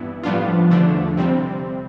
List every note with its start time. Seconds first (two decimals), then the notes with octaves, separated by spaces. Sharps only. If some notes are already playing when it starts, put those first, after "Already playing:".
Already playing: G2 E3 B3 E4
0.23 A2 F3 G3 B3 D4 F4
0.71 E2 D3 A3 D4
1.17 C3 G3 C4